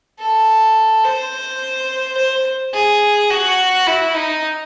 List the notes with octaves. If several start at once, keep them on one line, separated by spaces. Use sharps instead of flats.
A4
C5
C5
G#4
F#4
E4
D#4